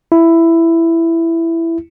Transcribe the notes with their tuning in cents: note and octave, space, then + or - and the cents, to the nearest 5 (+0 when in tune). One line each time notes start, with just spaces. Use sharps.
E4 +10